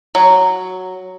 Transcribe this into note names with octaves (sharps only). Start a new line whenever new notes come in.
F#3